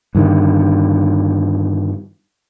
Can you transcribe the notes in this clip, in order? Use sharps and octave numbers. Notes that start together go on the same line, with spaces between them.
G2 D3 D#3